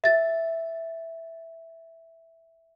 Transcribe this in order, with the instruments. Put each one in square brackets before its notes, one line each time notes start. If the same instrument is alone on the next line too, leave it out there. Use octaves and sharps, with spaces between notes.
[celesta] E5 A6